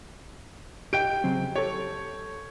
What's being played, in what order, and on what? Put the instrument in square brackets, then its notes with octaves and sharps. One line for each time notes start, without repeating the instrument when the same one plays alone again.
[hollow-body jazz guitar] G4 D#5 [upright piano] G5 G6 D7
[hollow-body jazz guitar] C#3 F#3 C4
[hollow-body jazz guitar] G4 A4 [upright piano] C#5